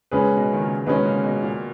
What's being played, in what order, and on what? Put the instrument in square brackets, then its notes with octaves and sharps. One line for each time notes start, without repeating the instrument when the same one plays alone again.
[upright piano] A#2 C#3 [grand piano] G#3 C#4 G#4 B4
[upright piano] B2
D#3
A#2 C#3
[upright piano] B2 D#3 [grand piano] G#3 C#4 G#4 B4
[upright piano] A#2 C#3
B2
A#2